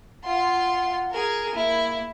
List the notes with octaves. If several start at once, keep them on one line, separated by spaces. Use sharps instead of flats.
F4 F#5 C6
G#4 A#4
A#3 E4